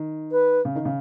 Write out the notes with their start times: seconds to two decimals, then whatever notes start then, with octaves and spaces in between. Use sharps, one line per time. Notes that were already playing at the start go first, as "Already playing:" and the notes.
Already playing: D#3
0.31 B4
0.65 C#3
0.75 D#3
0.85 C#3